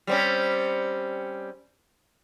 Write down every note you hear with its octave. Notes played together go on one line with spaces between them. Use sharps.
G3 C4 C#4